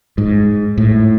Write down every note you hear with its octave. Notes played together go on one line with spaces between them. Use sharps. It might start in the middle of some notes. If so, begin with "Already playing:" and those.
G#2
A2